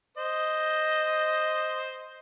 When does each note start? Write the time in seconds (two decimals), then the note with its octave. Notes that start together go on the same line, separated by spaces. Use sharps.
0.17 C5 D#5